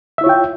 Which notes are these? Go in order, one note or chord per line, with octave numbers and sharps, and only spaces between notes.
E4 F4 C#5 E5 G5